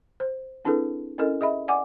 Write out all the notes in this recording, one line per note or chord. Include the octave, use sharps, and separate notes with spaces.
C5
C4 D4 E4 G#4 A4 B4
C#4 E4 A4 A#4 D#5
G#4 D#5 E5 B5
D5 F#5 G#5 D6